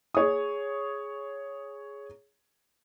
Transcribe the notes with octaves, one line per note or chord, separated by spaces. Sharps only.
G#4 C#5 D#6